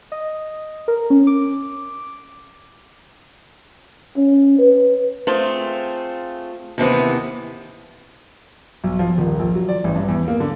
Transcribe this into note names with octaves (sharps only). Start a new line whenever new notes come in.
D#5
A#4
C#4
D6
C#4
B4
A3 C4 F4 G#4
D#2 C3 E3 B3
B1
F3
D#1
A#1
F#3
D5
A1
G2
E2
A#3
D3